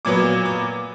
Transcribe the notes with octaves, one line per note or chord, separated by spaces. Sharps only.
A#2 F#3 B3 D6
D6